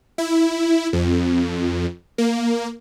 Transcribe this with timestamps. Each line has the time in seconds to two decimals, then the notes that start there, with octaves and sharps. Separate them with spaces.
0.18 E4
0.93 F2
2.18 A#3